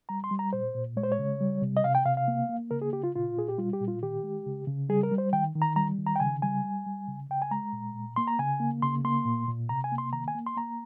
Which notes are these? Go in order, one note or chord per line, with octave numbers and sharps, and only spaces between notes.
G3 A#5
C6
G3
A#5
A#2 C5
A#2
G#3 C#5
C5
C#5
C#3
G3
C3
D#5
C3 F5
G5
C3 F5
F5
A#3
A#3
C#3 A#4
G#4
C#3 G4
F4
A#2 F4
A#2 G#4
G4
G3 F4
G4
A#2
F4
D#3 G4
G#3
C#3
C#3
G3 G#4
A#4
G3
C5
D#3 G5
D#3
A#5
G3 A#5
D#3
A#5
G5
C#3 G#5
G3 G#5
G3
G3
C#3
C#3 G5
G#5
G#3 A#5
A#2
A#2
A#3 C6
A#5
C#3 G#5
A#3
C#3 C6
A#3 C6
A#2
A#2
C3 A#5
G#5
A#3
C6
D#3 A#5
G#5
A#3
C6
A#3 A#5